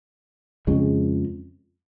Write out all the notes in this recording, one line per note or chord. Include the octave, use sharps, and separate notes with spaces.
F2 C#3 G#3